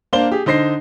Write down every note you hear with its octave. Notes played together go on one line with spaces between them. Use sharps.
A#3 D4 C5 F5 G7
G4 G#4
D3 D#4 C5 A#6 C7